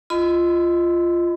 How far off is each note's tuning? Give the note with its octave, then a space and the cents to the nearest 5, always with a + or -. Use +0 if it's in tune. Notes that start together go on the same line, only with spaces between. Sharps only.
F4 -10 D#5 +0 B5 +40